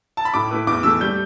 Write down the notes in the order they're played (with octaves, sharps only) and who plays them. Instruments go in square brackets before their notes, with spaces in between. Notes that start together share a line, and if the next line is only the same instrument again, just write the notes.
[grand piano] A5
B5
[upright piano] A2 [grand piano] D6
[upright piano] A3 E4 B4
[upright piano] E2 [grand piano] D6
[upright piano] E3 A3 [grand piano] E6
[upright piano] G3 [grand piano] G6